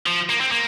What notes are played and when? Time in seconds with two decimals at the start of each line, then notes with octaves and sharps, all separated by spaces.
0.06 F3
0.30 A#3
0.40 C4
0.52 A#3